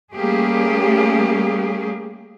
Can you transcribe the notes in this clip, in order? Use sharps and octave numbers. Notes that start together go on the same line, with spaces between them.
G3 A3 A#3 C#4 G4 G#4